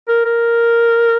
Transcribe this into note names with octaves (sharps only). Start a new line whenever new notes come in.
A#4
A#4